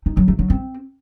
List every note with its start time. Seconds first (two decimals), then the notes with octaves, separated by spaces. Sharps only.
0.06 D#4
0.17 F#3
0.28 A3
0.39 F#3
0.50 C4